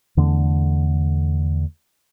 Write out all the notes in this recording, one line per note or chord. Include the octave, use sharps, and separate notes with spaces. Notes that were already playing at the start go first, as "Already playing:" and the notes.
E2 D3 A3